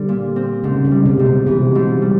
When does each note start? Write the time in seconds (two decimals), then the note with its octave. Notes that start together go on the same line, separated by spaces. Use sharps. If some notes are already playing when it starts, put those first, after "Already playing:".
Already playing: D3 G3 C4
0.09 A#2
0.36 C4
0.63 G#2 C#3
0.85 C#3
0.91 G3
1.05 C3
1.19 G#2
1.26 B2
1.46 C3 E3
1.75 G#2
2.02 G3